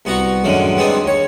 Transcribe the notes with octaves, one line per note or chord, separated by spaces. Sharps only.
C2 B3 F#4 A#5 C#6
F#2 A2 D3 D#3 F#3 G#3
G3 G#3 B3 C4 D4 D#4
D#2 C#5